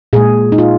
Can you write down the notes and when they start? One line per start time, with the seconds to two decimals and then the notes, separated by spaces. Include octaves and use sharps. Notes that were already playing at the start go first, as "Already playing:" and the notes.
0.13 A#2 G#3 G#4
0.52 D#4
0.58 F4